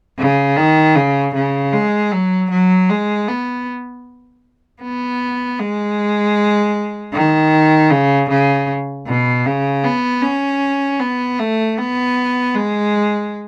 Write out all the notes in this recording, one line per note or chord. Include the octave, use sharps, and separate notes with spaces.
C#3
D#3
C#3
C#3
G#3
F#3
F#3
G#3
B3
B3
G#3
D#3
C#3
C#3
B2
C#3
B3
C#4
B3
A3
B3
G#3